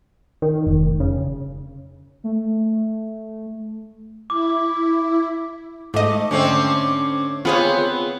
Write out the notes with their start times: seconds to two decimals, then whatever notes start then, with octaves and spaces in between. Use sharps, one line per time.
0.42 D#3
0.67 F1
1.00 C#3
2.24 A3
4.30 E4 D6
5.94 G#2 A3 D#5 D6
6.31 D3 A3 C4 C#4 F#5
7.45 B3 C4 F4 G#4 C5 C#5